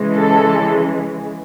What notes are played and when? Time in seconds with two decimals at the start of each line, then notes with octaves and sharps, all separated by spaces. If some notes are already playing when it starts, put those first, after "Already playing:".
Already playing: C#3 E3 G#3
0.15 A4